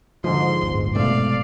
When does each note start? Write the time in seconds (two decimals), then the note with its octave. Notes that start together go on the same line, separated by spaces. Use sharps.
0.24 G#2 D3 F3 C6
0.61 D1 G1
0.95 F1 B2 A3 D5 F5